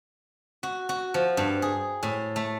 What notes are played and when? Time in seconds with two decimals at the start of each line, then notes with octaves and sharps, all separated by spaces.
0.63 F#4
0.89 F#4
1.14 F3
1.37 G2
1.62 G#4
2.03 A2
2.36 A3